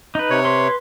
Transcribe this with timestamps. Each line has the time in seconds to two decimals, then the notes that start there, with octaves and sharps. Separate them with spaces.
0.15 D#4 B4
0.30 C3 C#5
0.45 B4 C6